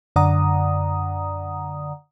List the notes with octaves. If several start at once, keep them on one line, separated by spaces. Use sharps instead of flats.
F#2 D3 D5 F#5 A#5 D#6